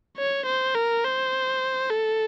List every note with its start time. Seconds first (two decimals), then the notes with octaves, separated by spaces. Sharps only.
0.18 C#5
0.46 C5
0.75 A#4
1.04 C5
1.90 A4